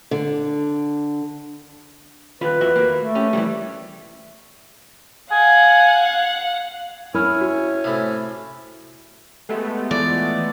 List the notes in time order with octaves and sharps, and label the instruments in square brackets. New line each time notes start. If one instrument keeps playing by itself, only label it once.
[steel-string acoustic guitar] D3
[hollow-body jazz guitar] D#2 F4 B5 [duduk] B4
[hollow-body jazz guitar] E2 F#4 E5
A#3
[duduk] A3
[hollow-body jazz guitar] C#4 G4
E3 F#3 G3
[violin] F5 F#5 [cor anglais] G#5
[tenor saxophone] C#4 [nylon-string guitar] E4 [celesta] A#4 B5 F6
[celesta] F#4
[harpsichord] A2 C3
[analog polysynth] G#3 A3 B3 [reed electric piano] G4 A4
[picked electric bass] E3 [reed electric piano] F4 A4 [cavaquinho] D5